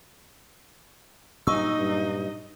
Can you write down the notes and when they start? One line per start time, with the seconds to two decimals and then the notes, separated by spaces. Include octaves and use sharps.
1.47 G2 A#2 F#3 D#4 D#5 C#6 E6
1.79 G2